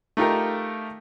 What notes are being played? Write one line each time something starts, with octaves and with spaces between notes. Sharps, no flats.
A3 D#4 F4 G4 A#4